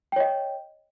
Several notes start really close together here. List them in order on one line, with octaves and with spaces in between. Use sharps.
G5 C#5 D#5